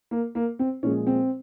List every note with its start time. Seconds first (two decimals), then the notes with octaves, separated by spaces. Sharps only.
0.11 A#3
0.35 A#3
0.59 C4
0.83 A#2 F3 G#3 C#4
1.07 C4